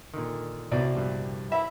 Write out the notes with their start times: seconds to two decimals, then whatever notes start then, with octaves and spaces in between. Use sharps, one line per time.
0.14 A#2 D3 D#3
0.71 C2 B2 D5
0.95 A#1 G2
1.52 E4 E5